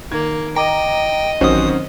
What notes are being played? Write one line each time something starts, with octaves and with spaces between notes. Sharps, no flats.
D#3 A#3 G#6
D#5 G5 A#5 D6
A1 F#2 D#3 C4 C#4 F#4 C5 D#6